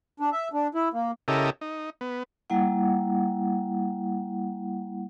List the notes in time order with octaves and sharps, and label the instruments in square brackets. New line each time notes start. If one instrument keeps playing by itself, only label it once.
[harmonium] D4
E5
D4
E4
A#3
[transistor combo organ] C#3 E4 G4 A4 A#4 D#5
D#4
B3
[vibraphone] G3 A#3 E4 F#5